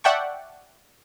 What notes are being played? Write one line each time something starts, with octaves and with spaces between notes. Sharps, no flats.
D5 E5 F#5 G5 A5 C#6